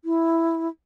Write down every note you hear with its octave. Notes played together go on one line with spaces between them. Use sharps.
E4